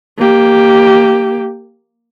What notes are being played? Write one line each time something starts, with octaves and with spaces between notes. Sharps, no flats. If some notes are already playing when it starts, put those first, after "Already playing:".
A#3 G4